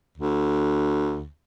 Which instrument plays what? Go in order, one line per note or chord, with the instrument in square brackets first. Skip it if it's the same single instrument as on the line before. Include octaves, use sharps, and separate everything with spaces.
[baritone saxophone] D2